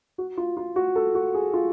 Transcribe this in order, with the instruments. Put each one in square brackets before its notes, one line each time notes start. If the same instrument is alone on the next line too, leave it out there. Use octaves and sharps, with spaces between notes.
[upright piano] F#4
F4
F4
F#4
A4
F#4
G#4
F4